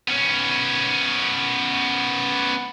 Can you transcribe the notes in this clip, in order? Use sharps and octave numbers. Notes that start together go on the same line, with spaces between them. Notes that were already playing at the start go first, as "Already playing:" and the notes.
B3 C#4